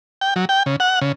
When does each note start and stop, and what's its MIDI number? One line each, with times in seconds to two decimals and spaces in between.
0.21 0.34 79
0.36 0.45 54
0.49 0.63 79
0.66 0.76 49
0.80 0.99 78
1.01 1.12 49